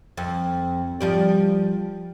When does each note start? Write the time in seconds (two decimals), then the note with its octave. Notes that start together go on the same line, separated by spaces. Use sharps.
0.17 F2
1.01 F3 G3 D5